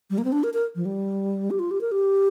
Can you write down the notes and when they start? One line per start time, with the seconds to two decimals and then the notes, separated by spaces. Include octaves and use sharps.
0.10 G3
0.18 A#3
0.25 C4
0.32 D4
0.43 A#4
0.54 A#4
0.76 F3
0.85 G3
1.51 G4
1.59 F4
1.71 G4
1.81 A#4
1.92 G4